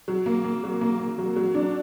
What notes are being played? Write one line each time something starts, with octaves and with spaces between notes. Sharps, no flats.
F#3
A#3
A#3
F#3
A#3
A#3
F#3
F#3
D4